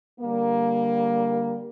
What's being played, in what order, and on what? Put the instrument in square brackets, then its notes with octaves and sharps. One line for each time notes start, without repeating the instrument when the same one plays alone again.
[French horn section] D3 G3 A#3